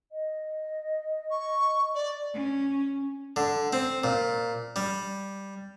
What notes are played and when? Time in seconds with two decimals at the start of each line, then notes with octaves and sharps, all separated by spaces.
0.12 D#5
1.31 C#6
1.95 D5
2.34 C#4
3.36 D3
3.73 C4
4.04 A#2
4.76 G3